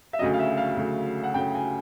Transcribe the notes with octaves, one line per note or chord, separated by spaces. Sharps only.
E5
D2 C#3 F#3 D#5
F5
E5
F5
D2 C#3 F#3
F#5
D2 C#3 F#3 G5
G#5